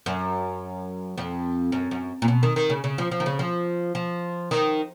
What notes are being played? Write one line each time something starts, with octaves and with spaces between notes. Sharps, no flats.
F#2
F2
F#2
F#2
A#2
B2
D#3
D#3
C#3
C#3
F3
F3
D#3
C#3
F3
F3
D#3